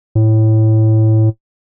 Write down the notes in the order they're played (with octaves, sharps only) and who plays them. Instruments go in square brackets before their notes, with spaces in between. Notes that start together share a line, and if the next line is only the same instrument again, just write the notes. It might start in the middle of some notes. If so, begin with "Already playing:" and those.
[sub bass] A2